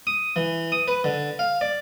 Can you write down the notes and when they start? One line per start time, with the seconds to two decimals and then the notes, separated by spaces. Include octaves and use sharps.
0.07 D#6
0.36 E3
0.72 D#6
0.88 B4
1.04 D3
1.39 F5
1.61 D5